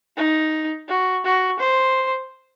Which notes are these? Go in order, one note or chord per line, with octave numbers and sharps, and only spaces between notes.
D#4
F#4
F#4
C5